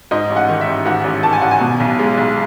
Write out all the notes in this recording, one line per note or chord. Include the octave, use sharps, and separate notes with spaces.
G#2 D#5
A1
F#5
D#3
E5
A1
G#2 F#5
A1
D#3 A5
G#5
A1 F#5
G#5
B2
B1
G#3
B1